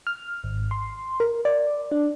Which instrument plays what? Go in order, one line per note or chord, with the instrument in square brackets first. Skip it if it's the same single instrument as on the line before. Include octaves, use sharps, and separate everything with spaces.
[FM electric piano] F6
G#1
C6
A#4
D5
D4